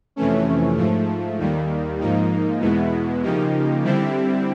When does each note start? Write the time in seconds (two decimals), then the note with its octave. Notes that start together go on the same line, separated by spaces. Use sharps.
0.16 F2 C3 E3 A3 C#4
0.77 G#2 F3 A3
1.38 D#2 D#3 G3 A#3
2.00 G#2 F3 A#3 D#4
2.61 E2 B2 G#3 B3 E4
3.23 C#3 F3 A#3 D#4 G4
3.84 D3 G3 C4 E4 G4